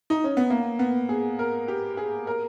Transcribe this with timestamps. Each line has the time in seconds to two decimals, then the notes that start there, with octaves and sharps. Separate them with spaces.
0.10 D#4
0.24 C#4
0.37 B3
0.50 A#3
0.79 B3
1.09 G#4
1.39 A#4
1.68 G4
1.97 G#4
2.27 A#4